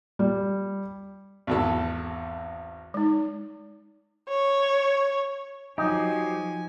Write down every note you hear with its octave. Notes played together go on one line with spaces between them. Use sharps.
G3
G#1 E2 A4
G#3 D#4
C#5
F3 F#3 D#4 G4 G#5